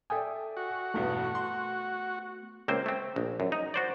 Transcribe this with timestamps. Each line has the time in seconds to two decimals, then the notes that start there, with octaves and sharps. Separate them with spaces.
0.10 A4 D5 E5 G5 G#5 D#6
0.57 F#4
0.94 E2 G2 B2 A3 B3
1.35 C6
2.68 C#2 A#3 C4 C5
2.86 A3 C4
3.16 A#1
3.40 F#2
3.52 D#4
3.74 F#4 C5 D5